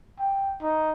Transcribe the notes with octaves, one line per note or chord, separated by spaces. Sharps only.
G5
D#4